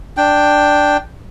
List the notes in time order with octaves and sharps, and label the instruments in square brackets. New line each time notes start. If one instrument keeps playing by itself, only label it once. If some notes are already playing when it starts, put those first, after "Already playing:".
[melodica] D4 G5